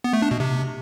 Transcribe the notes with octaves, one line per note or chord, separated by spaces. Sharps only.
B3
A3
D4
B2
C3